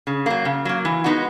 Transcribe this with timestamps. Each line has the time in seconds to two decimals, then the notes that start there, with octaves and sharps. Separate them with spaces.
0.07 C#3
0.26 F#3 A#3
0.45 C#3
0.65 F#3 A#3
0.85 E3
1.04 G#3 B3 D#4 F#4